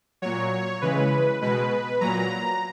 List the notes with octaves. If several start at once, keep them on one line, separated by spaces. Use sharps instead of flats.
A#2 F#3 C#5
C#3 E3 G#3 B4
B2 G#3 B4
A#2 F#3 A#5